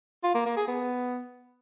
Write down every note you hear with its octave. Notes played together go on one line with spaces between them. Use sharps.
F4
A#3
A#3
G#4
B3